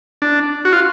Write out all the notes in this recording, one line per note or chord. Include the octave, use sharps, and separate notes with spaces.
D4
F#4
F4